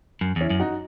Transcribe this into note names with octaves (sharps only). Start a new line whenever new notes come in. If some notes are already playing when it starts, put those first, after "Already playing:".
F#2
E2 C#4 E4
F#2
D#4 F#4